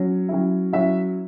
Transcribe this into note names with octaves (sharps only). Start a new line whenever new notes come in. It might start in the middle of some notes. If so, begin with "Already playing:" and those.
Already playing: F#3 C#4
F#3 C#4 E4
F#3 C#4 E4 E5